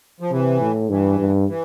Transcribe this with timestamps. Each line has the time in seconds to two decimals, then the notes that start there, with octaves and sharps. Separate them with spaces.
0.20 F3
0.31 C3 E3
0.61 A2
0.89 G2 E3
1.19 G2
1.48 E3